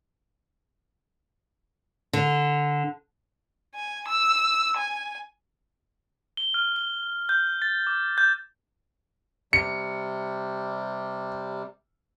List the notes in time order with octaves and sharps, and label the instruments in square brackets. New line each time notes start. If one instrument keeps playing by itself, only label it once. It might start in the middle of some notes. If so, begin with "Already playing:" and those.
[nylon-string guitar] D3
[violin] G#5
E6
G#5
[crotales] G7
F6
G7
G6
A6
D6
G6
[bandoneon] C3 G3 [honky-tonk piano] C#7